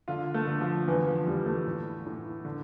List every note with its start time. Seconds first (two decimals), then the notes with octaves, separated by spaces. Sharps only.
0.08 D3 F4
0.34 A3
0.48 D3
0.61 F3
0.88 E2 E3
1.07 F3
1.27 E2 G3
1.46 A3
1.66 A2
2.06 A2
2.45 D3